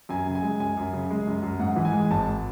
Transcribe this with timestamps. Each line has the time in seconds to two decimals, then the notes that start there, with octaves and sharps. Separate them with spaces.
0.09 F#2 G#5
0.27 C#3
0.35 G#5
0.43 G#3
0.60 F#2 G#5
0.77 F#2
0.93 C#3
1.11 G#3
1.27 F#2
1.43 F#2
1.59 G#2 F#5
1.76 E3
1.85 G#5
1.93 G#3
2.11 G#1 A5